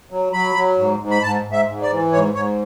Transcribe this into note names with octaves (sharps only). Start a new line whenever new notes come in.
F#3
F#3 B5
F#3
G#2
G#2
B5
G#2 A5
G#2
E5
G#2
D5
E3
G#2 C#5
G#2 C#5